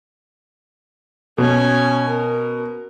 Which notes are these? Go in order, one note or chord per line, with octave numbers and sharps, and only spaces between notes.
B2 C#4 G#5
A#4